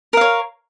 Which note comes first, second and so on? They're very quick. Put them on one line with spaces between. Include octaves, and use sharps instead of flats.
A#4 F5 C#5